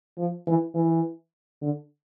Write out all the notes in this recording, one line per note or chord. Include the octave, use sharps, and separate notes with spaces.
F3
E3
E3
D3